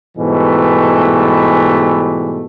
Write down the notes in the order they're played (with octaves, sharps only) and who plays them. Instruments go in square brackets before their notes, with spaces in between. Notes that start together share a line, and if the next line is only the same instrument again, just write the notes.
[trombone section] G#2 B2 E3 G3 A3